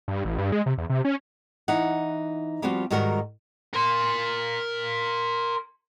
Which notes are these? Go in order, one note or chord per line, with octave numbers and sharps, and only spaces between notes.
G2
A1
G2
G#3
C3
E2
C3
C#4
E3 D#4 F#5
F3 G3 B3 C4 F4 F#4
G#2 D#3 G3 F#4 A#4
A#4 C6